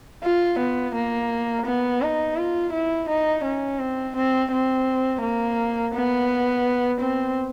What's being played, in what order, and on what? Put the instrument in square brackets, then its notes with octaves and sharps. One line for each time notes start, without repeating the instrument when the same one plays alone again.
[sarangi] F4
B3
A#3
B3
D#4
F4
E4
D#4
C#4
C4
C4
C4
A#3
B3
C4